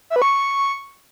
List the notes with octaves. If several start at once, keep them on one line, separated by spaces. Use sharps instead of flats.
E5
B4
C#6